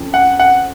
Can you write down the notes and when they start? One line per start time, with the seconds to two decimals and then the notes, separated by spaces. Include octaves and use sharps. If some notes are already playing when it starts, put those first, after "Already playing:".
Already playing: F2 C#3 F3 A3 C#4
0.14 F#5
0.40 F#5